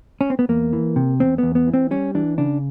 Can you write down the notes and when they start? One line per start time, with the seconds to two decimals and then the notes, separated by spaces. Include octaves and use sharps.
0.21 C#4
0.30 C4
0.39 B3
0.49 E2 A#3
0.73 E3
0.96 C3
1.20 E2 C4
1.38 E2 B3
1.55 B3
1.67 E3
1.74 C4
1.91 G3 C#4
2.15 E3 D4
2.38 C#3 D4